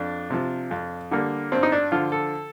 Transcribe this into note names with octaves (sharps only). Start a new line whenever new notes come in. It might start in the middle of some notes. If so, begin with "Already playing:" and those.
Already playing: F2 D4
C3 F3
F2
D3 G3 A#3
G2 C4
D#4
D4
D3 F3 F4
A4